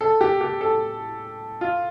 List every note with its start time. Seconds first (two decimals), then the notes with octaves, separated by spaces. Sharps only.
0.01 A4
0.21 G4
0.41 G4
0.61 A4
1.61 F4